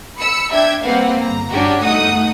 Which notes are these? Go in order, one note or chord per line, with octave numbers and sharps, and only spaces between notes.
B5 E6 C#7
D4 E5 G5 G#6
G3 A#3 C4 B4 F5 F#5
G1 A#5
G2 C#4 D4 F#4 G4
G1 A3 D#4 F#5 D#6